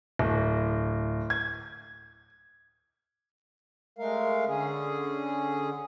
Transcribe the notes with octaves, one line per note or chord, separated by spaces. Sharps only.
D1
G#6
G#3 A3 A#4 F5
D3 C#4 G#4